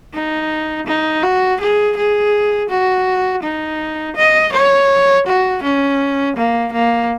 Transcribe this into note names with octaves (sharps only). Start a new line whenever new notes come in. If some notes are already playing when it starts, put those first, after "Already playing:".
D#4
D#4
F#4
G#4
G#4
F#4
D#4
D#5
C#5
F#4
C#4
A#3
A#3